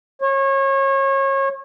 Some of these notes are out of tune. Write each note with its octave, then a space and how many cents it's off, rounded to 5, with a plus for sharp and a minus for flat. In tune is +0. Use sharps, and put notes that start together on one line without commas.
C#5 -30